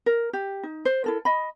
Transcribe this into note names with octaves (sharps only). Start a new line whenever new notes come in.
A#4
G4
D#4
C5
E4 A4 A#4
D#5 B5